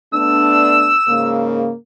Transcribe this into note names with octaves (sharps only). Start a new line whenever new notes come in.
A3 B3 D4 E6
G#2 C#3 A#3